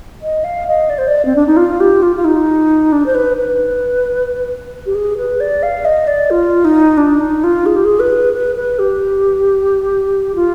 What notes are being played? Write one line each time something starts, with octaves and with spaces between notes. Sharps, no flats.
D#5
F5
D#5
D5
C5
D5
C4
D4
D#4
F4
G4
F4
F4
D#4
D4
C5
B4
B4
G4
G#4
B4
D5
F5
D#5
D5
F4
D#4
D4
D#4
F4
G#4
G4
G#4
B4
B4
B4
G4
F4